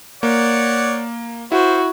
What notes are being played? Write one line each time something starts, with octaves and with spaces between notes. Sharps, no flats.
A#3 C#5 D5 F#5
E4 F#4 C5